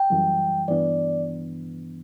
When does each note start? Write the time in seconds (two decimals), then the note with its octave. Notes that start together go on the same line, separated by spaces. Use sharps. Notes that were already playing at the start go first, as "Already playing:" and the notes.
Already playing: G5
0.10 F#2 E3 G3
0.68 G2 E3 B3 D4 D5